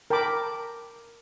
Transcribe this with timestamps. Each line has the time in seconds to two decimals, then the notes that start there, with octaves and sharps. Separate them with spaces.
0.10 A#4 G5 A5 B5 D6